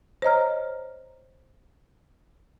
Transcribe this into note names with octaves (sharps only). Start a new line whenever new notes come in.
C5 C#5 D#5 A#5 F6